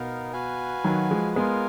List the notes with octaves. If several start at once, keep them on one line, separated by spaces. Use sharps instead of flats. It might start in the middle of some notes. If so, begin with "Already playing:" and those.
Already playing: B2 B3 D#4 A#4 F5
F#4 B4 F5 G#5
D#3 F#3
F3 G#3
G#3 B3 F4 A#4 F5 G#5